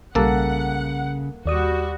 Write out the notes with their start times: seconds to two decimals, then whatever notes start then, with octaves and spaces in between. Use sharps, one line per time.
0.15 B1 C#3 G3 A#3 A4 F#5
1.46 D#2 G3 F#4 D5 D#6